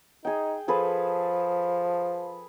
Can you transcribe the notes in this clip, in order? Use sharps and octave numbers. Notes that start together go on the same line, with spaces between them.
D#4 G#4 G5
F3 G#4 A4 B4